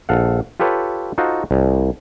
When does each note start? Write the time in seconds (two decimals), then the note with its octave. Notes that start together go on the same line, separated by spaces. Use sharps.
0.09 A#1 A4 F5 F#5
0.60 F4 G4 A4 B4 C#5
1.18 D#4 F4 F#4 A4 C5
1.51 C2